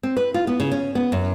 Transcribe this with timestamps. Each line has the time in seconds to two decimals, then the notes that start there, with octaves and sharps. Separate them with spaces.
0.03 C4
0.17 B4
0.34 F4
0.47 B3
0.60 C#3
0.71 C#4
0.95 B3
1.12 F#2